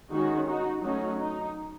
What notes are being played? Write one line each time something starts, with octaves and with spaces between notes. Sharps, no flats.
D#3 G#3 C#4 D#4 F#4
D#4 F#4
F#3 A3 C#4 D#4 F#4
D#4